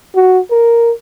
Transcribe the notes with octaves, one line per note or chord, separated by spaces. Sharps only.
F#4
A#4